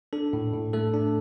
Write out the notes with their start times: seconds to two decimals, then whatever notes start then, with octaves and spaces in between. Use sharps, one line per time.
0.13 D4 A4
0.33 A2
0.53 A2
0.73 A3 A4
0.94 D4